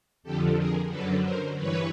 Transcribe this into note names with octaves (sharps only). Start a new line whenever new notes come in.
F2 D3 F3 G4 A4
G#4 A#4
F#2 D3 F#3 A4 B4
A#4 C5
G2 E3 B4 C#5